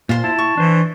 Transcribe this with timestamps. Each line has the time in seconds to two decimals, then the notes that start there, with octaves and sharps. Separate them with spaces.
0.09 A#2 F4 C5 C6
0.24 E4 A5
0.38 C#6
0.58 E3 D4 C5